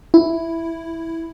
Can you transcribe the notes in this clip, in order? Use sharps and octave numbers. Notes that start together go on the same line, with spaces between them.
E4